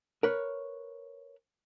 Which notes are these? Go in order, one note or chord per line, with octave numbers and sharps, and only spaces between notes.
A#4 B4 C#5